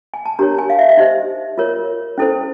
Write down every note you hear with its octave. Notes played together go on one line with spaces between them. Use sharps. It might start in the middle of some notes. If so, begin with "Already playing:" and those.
G#5
A5
D4 G4 A#4 C#5 A#5
G#5
F5
E5
E5
D#4 G4 C5 D#5
F4 A#4 C#5
C#4 E4 A4 C5